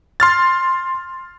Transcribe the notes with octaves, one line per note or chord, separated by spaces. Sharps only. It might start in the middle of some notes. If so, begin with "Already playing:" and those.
C6 F6 A6